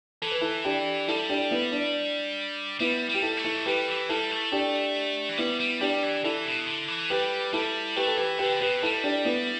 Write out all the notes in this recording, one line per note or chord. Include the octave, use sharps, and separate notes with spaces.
E3 A4
B4
E4 A4
D4 G4
G3 E4 A4
D4 G4
B3 E4
D4
G3 B3 E4
G3 G4
E4 A4
A3
E4 A4
E3
G3 G4 B4
E3
G3 E4 A4
A3
D4 G4
E3
G3 B3 E4
G3
G3 D4 G4
E3
E3 E4 A4
B2
D3
E3
G3 G4 B4
G3 E4 A4
A3 G4 B4
A4
E3 G4 B4
D3 G4 B4
B2 G4 B4
G3 E4 A4
D4 G4
B3 E4